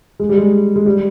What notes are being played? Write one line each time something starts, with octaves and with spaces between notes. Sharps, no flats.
G#3
G3
G#3
G#3
G3